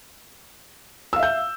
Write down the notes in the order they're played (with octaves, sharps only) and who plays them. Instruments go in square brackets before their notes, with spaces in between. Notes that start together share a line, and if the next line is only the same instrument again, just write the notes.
[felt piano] E6
F5
E5
G6